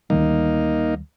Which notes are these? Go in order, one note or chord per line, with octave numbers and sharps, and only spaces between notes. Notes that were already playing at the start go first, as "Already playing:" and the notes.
D2 D#3 G3 A#3 D#4